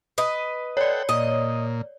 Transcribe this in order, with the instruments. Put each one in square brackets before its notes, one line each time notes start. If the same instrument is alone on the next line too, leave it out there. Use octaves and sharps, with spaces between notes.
[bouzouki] B4 D#5
[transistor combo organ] A4 F#5 G5 [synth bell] C#5 D5
[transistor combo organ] A#2 [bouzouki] D#5